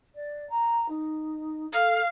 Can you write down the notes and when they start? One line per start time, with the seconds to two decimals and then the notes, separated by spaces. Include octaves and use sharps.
0.15 D5
0.50 A#5
0.89 D#4
1.72 A4 F5